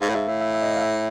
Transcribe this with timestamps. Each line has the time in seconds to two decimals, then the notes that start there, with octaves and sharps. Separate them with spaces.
0.02 G#2 F5
0.09 A2
0.15 G#2 E5
0.28 A2 E5
0.41 E5
0.54 E5
0.62 D#5
0.76 F5
0.81 E5